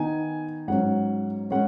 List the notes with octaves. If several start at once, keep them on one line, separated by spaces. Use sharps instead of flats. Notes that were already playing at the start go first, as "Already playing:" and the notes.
Already playing: D#3 B3 D#4 G#5
G#2 F#3 C#4 F#5
G#3 C#4 F#5